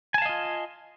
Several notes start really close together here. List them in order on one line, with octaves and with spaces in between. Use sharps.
G#5 A5 F5 D#5 F4